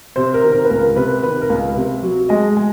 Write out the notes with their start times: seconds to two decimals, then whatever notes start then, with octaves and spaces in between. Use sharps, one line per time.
0.16 C3 C5
0.34 A#4
0.43 D#3
0.52 A#4
0.65 B4
0.70 C#2 A#4
0.96 C3 B4
1.23 D#3 B4
1.41 A#4
1.50 C#2
1.76 C3
2.03 F#3
2.29 G#3 D#5
2.57 G#3